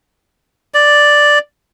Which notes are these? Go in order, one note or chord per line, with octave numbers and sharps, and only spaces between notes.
D5